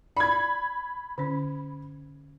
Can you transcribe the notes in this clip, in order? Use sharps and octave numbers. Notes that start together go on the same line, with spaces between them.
D5 B5 G#6
D3 C#4